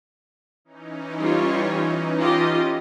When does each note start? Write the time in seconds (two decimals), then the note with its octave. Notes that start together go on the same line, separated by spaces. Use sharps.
0.65 E3 C#4 D#4
1.19 G3 F4 C#5
2.19 F4 G4 D#5